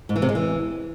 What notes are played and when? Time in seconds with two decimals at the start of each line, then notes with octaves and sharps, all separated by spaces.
0.09 G#2
0.16 E3
0.22 C3
0.29 G#3
0.35 E3